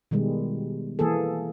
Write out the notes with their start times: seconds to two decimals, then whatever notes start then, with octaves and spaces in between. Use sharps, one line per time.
0.11 B2 D#3 G3 G#3
0.99 E3 A#3 G#4 A4